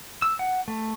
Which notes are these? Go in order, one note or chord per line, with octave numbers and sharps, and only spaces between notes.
E6
F#5
A3